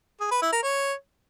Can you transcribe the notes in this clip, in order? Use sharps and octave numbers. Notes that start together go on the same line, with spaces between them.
G#4
B4
E4
A#4
C#5